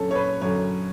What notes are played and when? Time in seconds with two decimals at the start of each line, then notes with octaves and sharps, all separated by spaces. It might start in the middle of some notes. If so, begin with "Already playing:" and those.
Already playing: F#2 D3 C#4 A4
0.11 C#5
0.15 B4
0.41 F#2 D3 C#5